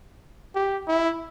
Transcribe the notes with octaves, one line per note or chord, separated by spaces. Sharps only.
G4
E4